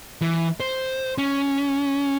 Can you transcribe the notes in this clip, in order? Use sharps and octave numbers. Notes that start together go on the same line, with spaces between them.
E3
C5
C#4